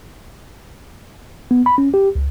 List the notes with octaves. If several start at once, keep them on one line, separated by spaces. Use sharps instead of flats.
B3
B5
C#4
G4
C#2